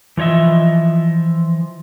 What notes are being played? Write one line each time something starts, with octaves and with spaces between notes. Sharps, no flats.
E3 F3 C#5 D#5 E5